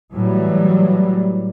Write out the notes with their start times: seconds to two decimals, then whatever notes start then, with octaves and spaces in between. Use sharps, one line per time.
0.14 A2 E3 F#3 G3